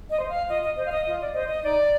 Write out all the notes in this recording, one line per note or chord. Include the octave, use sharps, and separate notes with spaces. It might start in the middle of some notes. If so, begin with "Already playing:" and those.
D#5
C5
F5
F4 D#5
D#5
C5 D#5
F5
D#5
F4 D#5
D5
C5 D#5
D#5
D#4 D5